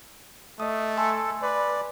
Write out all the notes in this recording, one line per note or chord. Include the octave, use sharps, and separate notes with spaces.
A3 D#5 D#6
A4 G#5 C6 E6
B4 D5